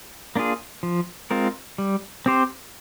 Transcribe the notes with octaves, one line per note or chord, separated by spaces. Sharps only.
A#3 D4 F4 G#4
F3
G#3 C4 F4 A#4
G3
C4 G4 C5